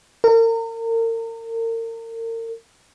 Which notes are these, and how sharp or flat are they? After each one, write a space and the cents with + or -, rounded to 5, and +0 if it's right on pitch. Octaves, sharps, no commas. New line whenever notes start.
A#4 -35